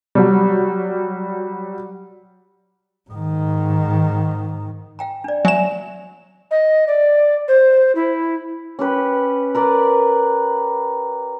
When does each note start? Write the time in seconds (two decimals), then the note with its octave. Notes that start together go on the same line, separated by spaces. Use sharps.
0.15 F#3 G3
3.10 G#2 D#3
4.99 F5 G5 A#5
5.24 D4 D5
5.45 F#3 D5 E5 G#5 E7
6.51 D#5
6.87 D5
7.48 C5
7.95 E4
8.79 C#4 G4 B4
9.55 A#4 B4 D5